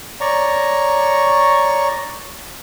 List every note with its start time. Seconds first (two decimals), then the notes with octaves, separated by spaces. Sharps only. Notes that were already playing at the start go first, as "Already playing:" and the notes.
0.21 C#5 D5 A#5 C#6